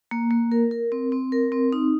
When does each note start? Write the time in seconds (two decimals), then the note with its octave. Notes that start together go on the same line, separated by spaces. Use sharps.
0.11 A#3
0.31 A#3
0.52 A#4
0.71 A#4
0.92 C4
1.12 C4
1.32 A#4
1.52 C4
1.73 D#4